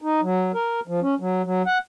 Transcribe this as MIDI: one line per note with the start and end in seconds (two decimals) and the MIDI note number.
0.02 0.21 63
0.22 0.52 54
0.54 0.80 70
0.87 1.00 53
1.02 1.15 61
1.20 1.42 54
1.44 1.62 54
1.66 1.78 78